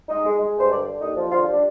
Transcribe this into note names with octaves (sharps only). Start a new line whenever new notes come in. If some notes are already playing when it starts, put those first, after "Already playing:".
G#3 D#4 D#5
G#3
G#3
G2 C5
D3 D4 D5
D3
D#2 D#4 D#5
F3
D3 F3 F4
G3 D4